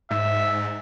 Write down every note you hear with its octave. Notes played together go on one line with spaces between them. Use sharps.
G#2 E5